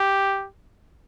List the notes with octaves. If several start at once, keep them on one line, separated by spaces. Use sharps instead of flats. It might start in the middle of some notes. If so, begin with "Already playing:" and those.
Already playing: G4